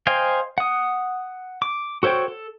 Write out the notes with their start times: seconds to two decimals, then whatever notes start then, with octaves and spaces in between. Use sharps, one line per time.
0.07 C5 D#5 F5 G5 G#5
0.58 F#5 D#6
1.62 D6
2.03 F#4 A4 C5 C#5 G5
2.28 A4